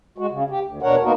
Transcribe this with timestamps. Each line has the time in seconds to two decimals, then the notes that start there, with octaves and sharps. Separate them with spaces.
0.18 G#3 F#4
0.31 C#3
0.50 G4
0.63 D2
0.83 E2 B2 D4 A#4 C#5 F#5
1.03 A#3 B3 D#4 F#4 A#4